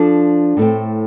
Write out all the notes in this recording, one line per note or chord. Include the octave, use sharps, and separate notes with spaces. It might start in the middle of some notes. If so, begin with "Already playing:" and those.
Already playing: F3 D4 A4 F5
A2 A3 C4